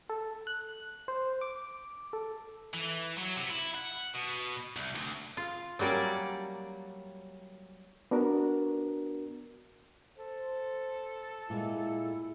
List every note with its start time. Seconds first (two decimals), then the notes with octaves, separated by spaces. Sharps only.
0.09 A4
0.47 F#6
1.08 C5
1.41 D6
2.13 A4
2.74 E3
3.18 F#3
3.37 C3
3.50 E4
3.75 F#5
4.14 B2
4.77 C2
4.95 D2
5.37 F4
5.79 F#3 G3 A#3 C#4 D5
8.11 B3 D4 F#4 A#4
10.18 A4 C5
11.50 A#2 G#3 E4